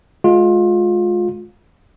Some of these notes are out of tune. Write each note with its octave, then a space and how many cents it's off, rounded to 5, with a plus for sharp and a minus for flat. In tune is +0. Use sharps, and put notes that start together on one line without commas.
G#3 +25 F4 +25